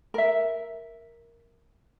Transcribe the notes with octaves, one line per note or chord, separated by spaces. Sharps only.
A#4 E5